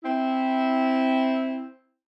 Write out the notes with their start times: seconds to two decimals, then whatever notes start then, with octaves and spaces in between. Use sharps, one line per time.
0.03 C4 E4